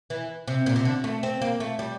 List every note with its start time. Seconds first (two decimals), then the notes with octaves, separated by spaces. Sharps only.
0.10 E3
0.48 C3
0.66 A#2
0.76 C3
0.85 D3
1.04 A3
1.23 C4
1.42 A#3
1.60 A3
1.79 G3